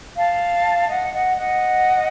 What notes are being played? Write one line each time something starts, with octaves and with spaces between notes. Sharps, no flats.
F5 A5
D#5 F#5
D#5 F#5
D#5 F#5